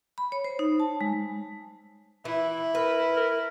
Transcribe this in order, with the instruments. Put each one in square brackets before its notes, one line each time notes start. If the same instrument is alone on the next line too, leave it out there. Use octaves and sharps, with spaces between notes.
[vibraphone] B5
C#5
C5
D#4
A5
G#3
[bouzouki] E3 [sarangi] E4
[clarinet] A#4 [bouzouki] B4
[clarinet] A#4